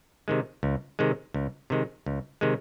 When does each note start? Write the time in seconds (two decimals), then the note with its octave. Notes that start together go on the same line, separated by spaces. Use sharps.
0.28 C3 D#3 G#3
0.63 C#2
0.99 C3 D#3 G#3
1.34 C#2
1.70 C3 D#3 G#3
2.06 C#2
2.41 C3 D#3 G#3